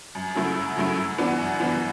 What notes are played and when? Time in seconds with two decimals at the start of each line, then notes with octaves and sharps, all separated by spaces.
0.15 F#2
0.35 C#3 F#3 A3 E4
0.55 F#2
0.77 C#3 F#3 A3 E4
0.97 F#2
1.18 E3 B3 D4 F#4
1.39 F#2
1.60 E3 B3 D4 F#4